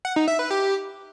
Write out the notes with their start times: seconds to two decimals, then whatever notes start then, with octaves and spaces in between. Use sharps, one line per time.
0.05 F#5
0.16 D#4
0.28 E5
0.39 B4
0.51 G4